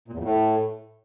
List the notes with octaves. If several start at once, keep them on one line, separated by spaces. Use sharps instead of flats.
A#2
E2
F2
A2